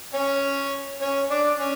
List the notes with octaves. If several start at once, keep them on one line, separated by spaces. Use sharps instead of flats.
C#4 C#5
C#4 C#5
D4 D5
C#4 C#5